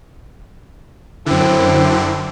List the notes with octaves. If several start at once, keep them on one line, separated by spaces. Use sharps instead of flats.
F#2 D3 C4 E4